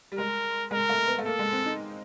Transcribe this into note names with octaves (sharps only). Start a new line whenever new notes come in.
G3
G#3 A#4
G#3 A#4
A3
B3
A3
A#3 A4
G#3
C4
D#4